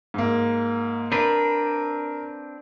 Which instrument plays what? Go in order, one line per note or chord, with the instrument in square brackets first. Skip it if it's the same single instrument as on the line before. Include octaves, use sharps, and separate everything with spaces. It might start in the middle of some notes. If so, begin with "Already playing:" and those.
[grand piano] G#2 A#3
[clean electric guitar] C4 D4 B4 [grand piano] A#4